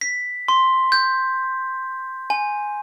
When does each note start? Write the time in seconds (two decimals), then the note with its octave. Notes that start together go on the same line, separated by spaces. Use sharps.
0.01 B6
0.48 C6
0.92 G6
2.30 G#5